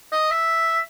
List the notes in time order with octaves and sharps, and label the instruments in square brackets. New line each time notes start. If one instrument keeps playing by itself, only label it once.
[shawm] D#5
E5